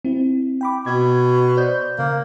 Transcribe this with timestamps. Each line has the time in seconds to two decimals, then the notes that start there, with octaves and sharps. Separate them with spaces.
0.05 C4 E4
0.61 G5 B5 D6
0.86 B2 G#6
1.57 C5 D5 G6
1.99 C#3 A#3